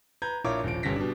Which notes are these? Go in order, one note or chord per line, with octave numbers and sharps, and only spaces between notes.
B4 A#5 G6 G#6
A#1 E4 F4 A#4 C#5 D6
D#1 F3 D7
G1 G3 C#4 A#6 B6
B2 G3 D4